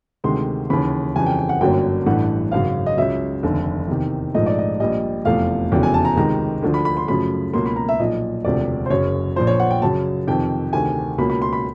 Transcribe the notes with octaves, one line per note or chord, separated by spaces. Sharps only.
D2 C3 D#3 G#3 C6
D#2 C#3 E3 B5
F2 C#3 E3 G3 G#5
G5
G5
F#5
G1 F#2 D3 F#3 A#3 G5
A1 G2 E3 A3 F#5
G#1 F#2 C#3 F5
D#5
C#2 C#3 F#3 E5
F1 D#2 D3
E2 C3 D#3
A#1 G#2 F3 A3 D#5
D5
D#5
A#1 A#2 G3 D#5
F1 E2 C3 F3 A3 F5
F1 E2 C#3 F#3 G5
G#5
A5
A#5
C#2 C3 D#3 G#3 A#5
D2 D3 F3
B5
B5
C6
F#2 C#3 F3 A3 B5
C#2 B2 F#3 A#3 C6
B5
A#5
E5
B1 A#2 F3 D#5
E1 D2 C3 F3 D5
C5
F#1 F#2 C#3 C#5
A#1 A#2 F3 C5
C#5
F#5
G5
F#2 C#3 F#3 A5
F2 C3 D#3 G5
D2 C3 D#3 G#5
C#2 B2 F#3 A#3 B5
B5
C6
B5